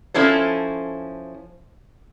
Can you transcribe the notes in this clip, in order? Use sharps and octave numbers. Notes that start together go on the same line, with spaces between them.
F3 C#4 E4 A4 C5